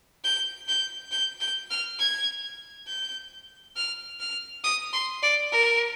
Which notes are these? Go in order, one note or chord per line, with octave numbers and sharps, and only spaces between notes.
G6
G6
G6
G6
F6
G#6
G6
F6
F6
D#6
C6
D5
A#4